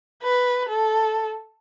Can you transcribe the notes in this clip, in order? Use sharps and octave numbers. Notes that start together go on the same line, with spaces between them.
B4
A4